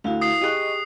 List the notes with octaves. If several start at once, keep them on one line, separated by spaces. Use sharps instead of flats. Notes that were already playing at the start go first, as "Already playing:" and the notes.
D2 E4 F#4 F5
D#6 C7
G4 G#4 D#5 C#6 F#6